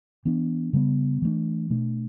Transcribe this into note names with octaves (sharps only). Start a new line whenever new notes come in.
E3 B3 D4
C#3 G3 B3
E3 A3 D4
B2 A3 D4